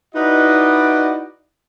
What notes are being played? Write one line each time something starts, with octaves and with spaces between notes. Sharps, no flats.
D#4 E4 F#4 B4 D5 D#5